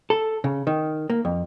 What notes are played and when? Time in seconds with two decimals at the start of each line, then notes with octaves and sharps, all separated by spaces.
0.10 A4
0.44 C#3
0.67 D#3
1.10 A#3
1.25 F2